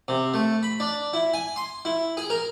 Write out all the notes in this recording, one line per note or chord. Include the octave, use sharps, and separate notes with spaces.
C3
A3
B5
D4
E4
G#5
C6
E4
G#4
A#4